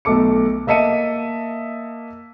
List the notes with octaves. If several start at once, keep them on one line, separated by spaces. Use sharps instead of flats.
B1 A3 A4 D6 C#7
A#3 D#5 E5 A5 C#7 D#7